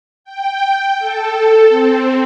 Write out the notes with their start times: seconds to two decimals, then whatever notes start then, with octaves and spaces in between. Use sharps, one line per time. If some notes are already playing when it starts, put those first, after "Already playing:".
0.24 G5
0.99 A4
1.69 C4